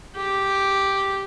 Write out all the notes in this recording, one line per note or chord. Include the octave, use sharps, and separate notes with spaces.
G4